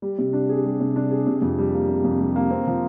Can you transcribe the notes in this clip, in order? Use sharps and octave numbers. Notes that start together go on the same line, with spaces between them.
G3
C3
D4
G#4
G3
C3
D4
G#4
C3
F2
G3
A#3
C3
F2
G3
A#3
C4
F3